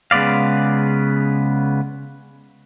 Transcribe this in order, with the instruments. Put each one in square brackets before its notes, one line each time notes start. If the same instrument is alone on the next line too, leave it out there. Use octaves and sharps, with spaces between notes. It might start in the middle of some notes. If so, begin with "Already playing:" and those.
[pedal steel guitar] C#3 G#3 B3 D5 F5